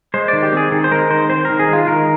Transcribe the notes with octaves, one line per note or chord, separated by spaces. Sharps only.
G#3 C5
D#3 D5
G4
C4 G#4
D#3 G#4
C5
G#3 A#4
D#3 C5
C4 C5
D#3 A#4
G#4
G#3
F4
D#3 A#4